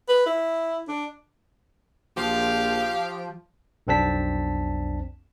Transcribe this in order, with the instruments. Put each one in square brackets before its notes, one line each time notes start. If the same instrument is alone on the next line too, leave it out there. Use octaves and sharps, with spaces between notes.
[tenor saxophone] B4
E4
D4
[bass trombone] A#1 [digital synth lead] F3 [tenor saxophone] G4 [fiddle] F5
[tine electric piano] B1 F2 C4 D4 A5 B6